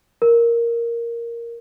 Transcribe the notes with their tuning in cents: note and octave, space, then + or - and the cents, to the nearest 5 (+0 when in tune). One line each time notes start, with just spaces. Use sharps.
A#4 +0